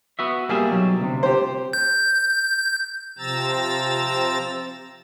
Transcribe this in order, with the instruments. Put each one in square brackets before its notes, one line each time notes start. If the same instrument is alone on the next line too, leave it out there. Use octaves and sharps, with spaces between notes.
[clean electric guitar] B3 F#4 E5
[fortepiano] G3 [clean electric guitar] A#3 G#4 E5
[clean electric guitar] B1 F#3
D2 C3
[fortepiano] G4 C5
[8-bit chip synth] G6
[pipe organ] C3 F3 C4 A#5 E6 A6